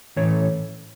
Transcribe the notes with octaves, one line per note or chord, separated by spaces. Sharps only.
A2 E3 A3 C#4 C#5